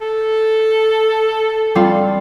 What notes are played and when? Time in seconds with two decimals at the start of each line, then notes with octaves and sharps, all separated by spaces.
0.01 A4
1.75 G3 C4 F4